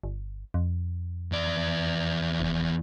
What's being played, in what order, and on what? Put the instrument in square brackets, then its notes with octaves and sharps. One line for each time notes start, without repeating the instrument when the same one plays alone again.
[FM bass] G1
F2
[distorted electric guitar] E2 D5
[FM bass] F1